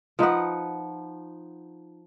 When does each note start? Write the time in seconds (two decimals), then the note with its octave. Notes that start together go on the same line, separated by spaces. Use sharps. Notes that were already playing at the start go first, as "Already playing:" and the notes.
0.19 F3 D#4 B4 F#5